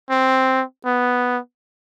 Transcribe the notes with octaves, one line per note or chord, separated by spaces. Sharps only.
C4
B3